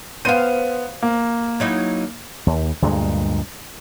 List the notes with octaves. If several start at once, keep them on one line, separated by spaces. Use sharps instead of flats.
B3 C5 F5 D#7
A#3
F#3 D#4 E4
D#2
D2 G2 A#2 G#3